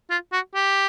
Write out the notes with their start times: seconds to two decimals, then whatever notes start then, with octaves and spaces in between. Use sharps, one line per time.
0.10 F4
0.32 F#4
0.54 G4